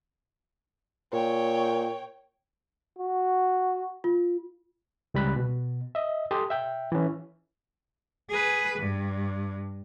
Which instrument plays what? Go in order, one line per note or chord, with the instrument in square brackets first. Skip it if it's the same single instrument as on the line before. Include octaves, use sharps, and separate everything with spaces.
[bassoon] A#2 [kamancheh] C#5 G5
[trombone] F#4
[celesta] F4
[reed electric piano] C#2 G3 B5 F#6
B2
D#5 E5
G4 A4 C6 D#6
E5 G5
E3 C#4
[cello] G#4 B4
G2